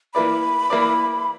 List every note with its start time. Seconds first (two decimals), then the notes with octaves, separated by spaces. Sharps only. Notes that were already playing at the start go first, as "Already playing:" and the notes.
0.14 E3 A#3 E4 B4 D5 B5
0.70 E3 A#3 E4 B4 D5